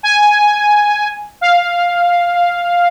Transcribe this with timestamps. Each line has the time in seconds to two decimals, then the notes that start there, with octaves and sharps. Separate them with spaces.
0.03 G#5
1.41 F5